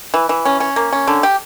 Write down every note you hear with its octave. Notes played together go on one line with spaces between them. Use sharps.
E3
E3
C#4
C#4
A#3
C#4
D3
G4